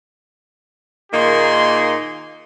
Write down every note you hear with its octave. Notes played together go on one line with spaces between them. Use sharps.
A#2 D#3 A#3 D#4 G#4 C6